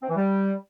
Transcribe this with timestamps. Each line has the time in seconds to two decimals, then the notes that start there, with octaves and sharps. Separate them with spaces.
0.02 C4
0.09 E3
0.16 G3